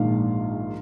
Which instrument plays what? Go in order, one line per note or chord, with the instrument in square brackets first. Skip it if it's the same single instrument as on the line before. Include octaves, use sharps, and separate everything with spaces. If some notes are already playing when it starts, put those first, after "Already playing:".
Already playing: [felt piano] A#1 G#2 D#3 A#3 D4 F5